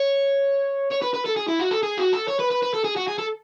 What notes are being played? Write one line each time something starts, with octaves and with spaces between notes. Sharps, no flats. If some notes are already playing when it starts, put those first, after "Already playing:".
Already playing: C#5
C#5
B4
B4
A4
G#4
E4
F#4
A4
G#4
F#4
A4
C#5
B4
B4
B4
A4
G#4
F#4
G#4
A4